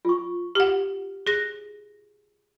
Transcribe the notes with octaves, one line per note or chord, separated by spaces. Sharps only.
F4 C#6
G4 F#5
G#4 A#6